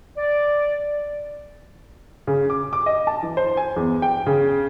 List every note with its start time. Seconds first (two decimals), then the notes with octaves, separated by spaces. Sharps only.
0.18 D5
2.27 C#3
2.50 D6
2.73 D6
2.86 D#5
3.07 A5
3.23 E3
3.37 C5
3.57 G#5
3.76 E2
4.02 G5
4.26 C#3